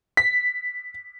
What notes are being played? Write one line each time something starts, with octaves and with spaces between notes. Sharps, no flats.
B6